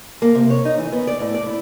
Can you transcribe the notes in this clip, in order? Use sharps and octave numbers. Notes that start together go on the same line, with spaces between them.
A#3
C3
C#5
D#4
E3
B3
D5
A2
D5
E4